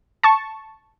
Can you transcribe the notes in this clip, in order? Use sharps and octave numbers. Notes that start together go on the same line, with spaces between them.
A5 C#6